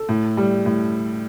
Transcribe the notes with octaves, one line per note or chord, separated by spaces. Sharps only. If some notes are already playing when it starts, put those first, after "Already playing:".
Already playing: A4
A2
G3
A2